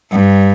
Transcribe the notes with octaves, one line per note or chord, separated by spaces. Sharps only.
G2